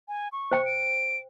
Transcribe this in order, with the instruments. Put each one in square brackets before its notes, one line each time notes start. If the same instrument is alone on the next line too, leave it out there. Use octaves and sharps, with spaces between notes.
[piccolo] G#5
C#6
[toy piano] C5 G5
[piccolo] D7